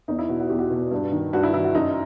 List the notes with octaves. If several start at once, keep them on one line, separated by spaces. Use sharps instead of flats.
E2 D#4
E4
B2 F#4
F#4
E2 G4
F#4
B2
G2
D#3
G2 F#4
E4
D#3 E4
F#4
F#2 D#4